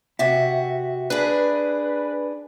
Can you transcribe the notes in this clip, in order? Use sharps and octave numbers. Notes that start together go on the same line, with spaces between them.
C3 F#4 E5
D4 G#4 B4